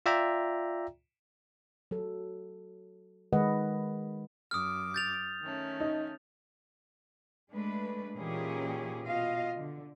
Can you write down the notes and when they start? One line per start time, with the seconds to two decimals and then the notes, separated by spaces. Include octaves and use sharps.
0.06 F4 D5 E5 G5 A#5
1.91 F#3 A4
3.33 D#3 G#3 B4 D#5 F#5
4.51 F#2 D6 D#6 F6
4.94 G6 A6 F7
5.43 D#3 A3 C#4
5.80 D#4
7.54 G#3 A3 D4 B4
8.15 A#2 E3 C#4 D#4 G4 G#4
9.08 B2 F4 D#5 F5
9.58 D3